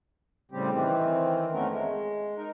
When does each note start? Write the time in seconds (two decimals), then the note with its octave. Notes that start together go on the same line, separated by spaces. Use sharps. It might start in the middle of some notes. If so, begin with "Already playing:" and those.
0.52 A2 C#3 G3 C4 G4
0.71 D#3 E3 C4
1.52 F2 A3 B3 C#4 A#4
1.69 G#3
2.37 D#4 A#4